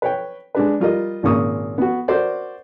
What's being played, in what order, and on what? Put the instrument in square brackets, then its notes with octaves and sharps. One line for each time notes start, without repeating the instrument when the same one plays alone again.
[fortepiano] B4 C#5 G5
G#3 D4 B4
G3 F4 A#4 D#5
G#1 A#2 C#3 A#3 C#6 D#6
B3 F#4
F#4 A#4 C5 D5